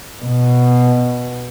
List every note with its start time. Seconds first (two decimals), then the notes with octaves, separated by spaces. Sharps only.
0.21 B2